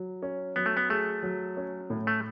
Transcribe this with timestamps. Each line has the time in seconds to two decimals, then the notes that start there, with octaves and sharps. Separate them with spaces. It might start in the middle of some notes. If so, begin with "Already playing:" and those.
Already playing: F#3
0.22 C#4
0.56 F#3 B3
0.66 A3
0.77 B3
0.90 A3 G#4
1.23 F#3
1.57 C#4
1.90 A2
2.07 A3